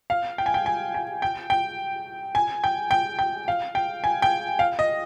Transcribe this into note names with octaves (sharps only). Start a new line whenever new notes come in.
F5
G5
G#5
G5
G#5
G#5
G5
G5
G#5
G5
G5
G5
F5
G5
G#5
G5
F5
D#5